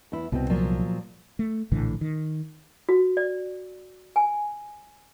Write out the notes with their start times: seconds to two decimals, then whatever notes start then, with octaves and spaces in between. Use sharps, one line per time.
0.12 E2 E4
0.32 C2 B2 C4
0.50 A#2 F3 F#3
1.39 A3
1.72 A#1 A2 D3 E3
2.01 D#3
2.89 F#4
3.17 D5
4.16 G#5